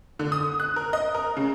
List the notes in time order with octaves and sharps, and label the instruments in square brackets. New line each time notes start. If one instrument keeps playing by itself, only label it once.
[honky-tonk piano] D3
D#6
F#6
A#4
D#5
A#4
C#3